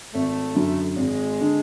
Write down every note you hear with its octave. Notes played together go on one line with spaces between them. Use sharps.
G#1 A3
F#2 D3
G#1 G#3
D3